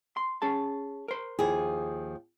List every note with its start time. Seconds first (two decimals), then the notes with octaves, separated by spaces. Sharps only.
0.17 C6
0.42 C#4 G#4 A5
1.08 A#4 C5
1.39 D#2 F3 E4 G#4